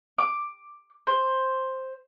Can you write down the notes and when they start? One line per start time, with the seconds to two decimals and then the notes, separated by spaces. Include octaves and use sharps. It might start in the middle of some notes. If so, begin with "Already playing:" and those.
0.18 D6
1.07 C5